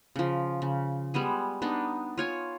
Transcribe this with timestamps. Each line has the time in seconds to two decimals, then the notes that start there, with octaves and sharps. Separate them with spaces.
0.16 C#3 F3
0.62 C#3
1.14 G3 G#3 B3 G#4
1.62 B3 D4 D#4
2.17 F4 C#5 G#5